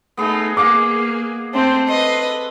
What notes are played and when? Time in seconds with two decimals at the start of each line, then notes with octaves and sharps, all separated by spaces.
0.17 A3 B3 D#4 G#4
0.57 A#3 G#4 D#5 F5 F#5 D6
1.54 A3 C4 C5
1.88 A4 B4 D#5 C6